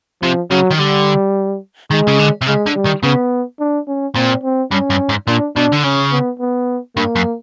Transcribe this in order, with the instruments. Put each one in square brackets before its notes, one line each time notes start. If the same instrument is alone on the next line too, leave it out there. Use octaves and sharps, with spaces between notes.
[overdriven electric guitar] C3 [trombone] F3
[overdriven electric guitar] C#3 [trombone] F#3
[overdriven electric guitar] D#3
[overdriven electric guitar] D3 [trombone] G3
[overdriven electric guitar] D#3 [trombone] G#3
[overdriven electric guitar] C#3
D3
C3
[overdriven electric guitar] C#3 [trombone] G#3
[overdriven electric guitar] D3
[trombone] G3
[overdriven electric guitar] D#3
[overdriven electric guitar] C#3 [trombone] B3
[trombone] D4
C#4
[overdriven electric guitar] A#2 [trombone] C4
[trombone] C4
[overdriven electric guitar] G2 [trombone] C#4
[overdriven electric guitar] G2
G#2
[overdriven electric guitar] A#2 [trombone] D4
[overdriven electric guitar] B2 [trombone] D4
[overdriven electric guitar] D3
[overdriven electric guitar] C#3 [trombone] C#4
[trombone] B3
B3
[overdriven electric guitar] G2 [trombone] A#3
[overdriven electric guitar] F#2